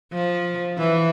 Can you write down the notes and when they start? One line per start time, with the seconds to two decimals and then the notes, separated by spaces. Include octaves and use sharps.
0.13 F3
0.78 E3